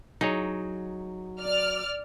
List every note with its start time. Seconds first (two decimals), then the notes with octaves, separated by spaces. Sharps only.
0.21 F#3 D#4 G#4 C#5
1.40 D5 F6